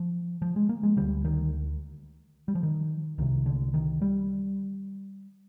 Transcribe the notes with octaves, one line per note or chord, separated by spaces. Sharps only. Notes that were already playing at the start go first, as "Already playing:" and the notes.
Already playing: F3
F3
G#3
A#3
G#3
D2 D3 G3
D#3
G3
F3
D#3
C2 C3 D#3
D3
D#3
G3